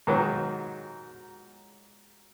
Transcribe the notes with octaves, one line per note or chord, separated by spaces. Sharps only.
G#2 D#3 F#3